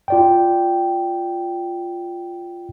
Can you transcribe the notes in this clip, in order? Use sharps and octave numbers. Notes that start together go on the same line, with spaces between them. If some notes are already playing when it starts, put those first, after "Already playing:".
F4 D5 G5